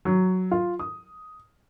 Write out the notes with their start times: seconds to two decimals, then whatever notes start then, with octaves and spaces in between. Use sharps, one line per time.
0.05 F#3
0.51 F4
0.79 D#6